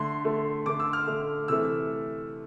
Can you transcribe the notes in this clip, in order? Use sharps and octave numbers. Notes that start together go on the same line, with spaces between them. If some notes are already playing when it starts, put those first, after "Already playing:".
Already playing: D3 A3 C6
D3 A3
D3 A3 D6
E6
F6
D3 A3
C3 E3 A3 E6